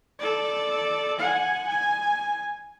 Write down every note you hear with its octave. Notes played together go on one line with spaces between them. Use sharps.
A4 D5
F#5 G#5
G#5